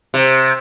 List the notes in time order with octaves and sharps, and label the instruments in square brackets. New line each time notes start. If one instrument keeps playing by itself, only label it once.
[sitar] C3